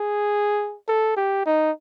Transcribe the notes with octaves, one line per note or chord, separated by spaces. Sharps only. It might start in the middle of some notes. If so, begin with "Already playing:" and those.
Already playing: G#4
A4
G4
D#4